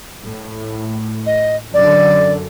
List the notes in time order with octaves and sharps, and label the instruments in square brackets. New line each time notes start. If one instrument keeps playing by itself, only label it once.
[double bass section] A2
[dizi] D#5
[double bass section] F#2 D3 [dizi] D5